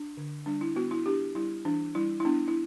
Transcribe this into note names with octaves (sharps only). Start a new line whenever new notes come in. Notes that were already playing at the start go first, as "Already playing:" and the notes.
Already playing: D4
D3
G3 D4
E4
B3 F#4
E4
D4 G4
G3 E4
E3 D4
G3 E4
E4
B3 D4
E4